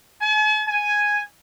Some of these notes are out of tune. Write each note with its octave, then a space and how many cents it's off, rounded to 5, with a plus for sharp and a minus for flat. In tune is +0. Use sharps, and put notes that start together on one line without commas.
G#5 +45
G#5 +0